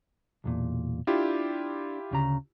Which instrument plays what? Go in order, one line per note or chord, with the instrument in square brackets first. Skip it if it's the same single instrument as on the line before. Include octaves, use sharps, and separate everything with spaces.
[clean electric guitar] B1 E2 A#2
[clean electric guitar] D4 [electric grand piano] E4 F4 G4
[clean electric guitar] D2 C#3 A#5